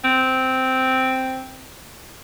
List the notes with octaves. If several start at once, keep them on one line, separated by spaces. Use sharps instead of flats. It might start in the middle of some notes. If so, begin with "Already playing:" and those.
C4